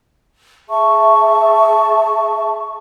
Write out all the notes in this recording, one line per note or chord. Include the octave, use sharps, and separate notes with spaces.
G#4 E5 A5 C#6